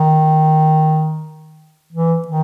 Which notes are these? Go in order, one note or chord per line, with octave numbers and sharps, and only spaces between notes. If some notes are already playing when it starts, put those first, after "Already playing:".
Already playing: D#3
E3
D#3